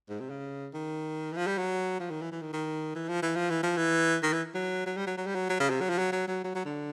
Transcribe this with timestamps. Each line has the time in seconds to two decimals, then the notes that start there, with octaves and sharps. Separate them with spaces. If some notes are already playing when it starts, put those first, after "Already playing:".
0.09 G#2
0.20 C3
0.30 C#3
0.73 D#3
1.33 E3
1.37 F3
1.47 G3
1.58 F#3
2.00 F3
2.11 D#3
2.22 E3
2.32 E3
2.42 D#3
2.53 D#3
2.95 E3
3.08 F3
3.22 E3
3.36 F3
3.50 E3
3.63 F3
3.77 E3
4.23 D#3
4.33 E3
4.55 F#3
4.86 F#3
4.97 G3
5.07 F#3
5.17 F#3
5.27 G3
5.35 F#3
5.50 F#3
5.60 C#3
5.70 C3
5.81 F#3
5.90 F3
5.98 F#3
6.12 F#3
6.28 F#3
6.44 F#3
6.55 F#3
6.65 D3